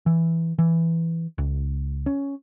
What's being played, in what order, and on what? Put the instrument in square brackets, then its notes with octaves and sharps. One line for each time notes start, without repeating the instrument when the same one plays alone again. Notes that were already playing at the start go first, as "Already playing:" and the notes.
[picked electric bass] E3
E3
C#2
C#4